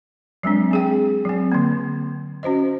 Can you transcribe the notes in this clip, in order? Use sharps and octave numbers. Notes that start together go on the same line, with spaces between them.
F#3 G#3 C4 D4
C4 G#4 G5
F#3 C4
D3 A#3
C#4 F#4 C5 D#5